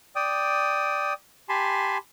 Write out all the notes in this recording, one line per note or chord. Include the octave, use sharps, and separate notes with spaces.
D5 G5 D#6
G4 G#5 A5 B5 C6